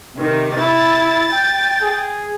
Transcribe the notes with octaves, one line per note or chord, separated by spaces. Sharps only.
C3 D#3
E4 A6
G5
G#4